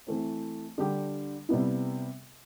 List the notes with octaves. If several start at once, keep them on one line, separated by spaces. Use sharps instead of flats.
E3 A3 C4
D3 G3 D4 G4
C3 G3 B3 E4